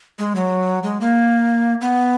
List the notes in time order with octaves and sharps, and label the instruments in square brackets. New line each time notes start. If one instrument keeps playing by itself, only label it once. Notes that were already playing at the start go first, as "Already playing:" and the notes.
[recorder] G#3
F#3
G#3
A#3
B3